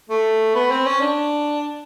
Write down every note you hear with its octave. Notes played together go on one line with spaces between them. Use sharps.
A3
B3
C4
C#4
D4